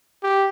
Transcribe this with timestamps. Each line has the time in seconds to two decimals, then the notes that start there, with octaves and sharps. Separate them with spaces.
0.23 G4